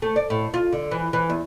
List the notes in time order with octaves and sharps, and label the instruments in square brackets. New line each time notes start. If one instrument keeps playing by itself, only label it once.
[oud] A3
D5
A2
F4
D3
E3
E3
E2